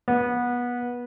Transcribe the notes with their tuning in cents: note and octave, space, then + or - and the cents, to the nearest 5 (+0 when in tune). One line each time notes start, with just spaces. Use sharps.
B3 -20